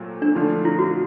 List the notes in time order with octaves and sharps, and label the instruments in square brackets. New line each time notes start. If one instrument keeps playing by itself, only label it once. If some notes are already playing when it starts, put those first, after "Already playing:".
Already playing: [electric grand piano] A#2 F#3 A3 C4
[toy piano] D4
[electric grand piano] D3 F3 A3 D4 F4 [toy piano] D#4
[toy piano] E4
F#4